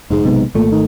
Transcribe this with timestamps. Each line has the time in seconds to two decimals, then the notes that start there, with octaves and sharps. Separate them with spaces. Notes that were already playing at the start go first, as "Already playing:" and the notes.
0.10 F1 G#2 G#3
0.24 B1 C3 B3
0.55 G#1 A#2 A3
0.72 D#3